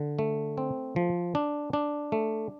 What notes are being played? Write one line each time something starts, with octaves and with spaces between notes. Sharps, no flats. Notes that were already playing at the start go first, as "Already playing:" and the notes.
Already playing: D3
A3
C4
F3
D4
D4
A3